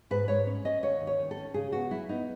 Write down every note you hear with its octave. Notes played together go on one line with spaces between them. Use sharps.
G#2 B4
G#2 C#5
C#4
C#4 D#5
D#2 C#5
D#3
C#5
D#3
A4
C#4
C#3 G#4
B3 F#4
F#3 E4
B3 D#4